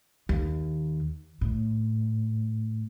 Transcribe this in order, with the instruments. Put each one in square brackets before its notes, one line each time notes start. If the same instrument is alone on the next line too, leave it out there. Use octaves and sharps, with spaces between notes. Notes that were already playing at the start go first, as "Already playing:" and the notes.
[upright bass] D#2
A2